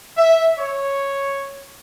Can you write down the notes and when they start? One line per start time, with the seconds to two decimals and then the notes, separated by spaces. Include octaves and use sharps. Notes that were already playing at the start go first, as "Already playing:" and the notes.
0.16 E5
0.57 C#5